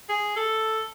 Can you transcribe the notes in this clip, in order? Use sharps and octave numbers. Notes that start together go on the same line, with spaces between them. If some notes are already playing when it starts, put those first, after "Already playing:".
G#4
A4